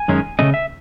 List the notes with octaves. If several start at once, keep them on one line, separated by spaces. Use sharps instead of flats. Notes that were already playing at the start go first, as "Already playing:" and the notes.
Already playing: G#5
F#2 D#3 G#3 C#4
C#3 E3 A3 C#4 D#5
E5